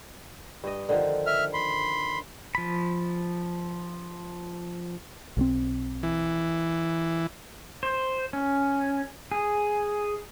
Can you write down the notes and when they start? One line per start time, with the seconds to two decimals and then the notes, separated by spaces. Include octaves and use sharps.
0.64 G2 D#5
0.89 D3 D#3 F3
1.26 E5 F6
1.53 B5 C6
2.55 F3 B5
5.37 B1 F#3 C4
6.03 E3
7.83 C5
8.33 C#4
9.32 G#4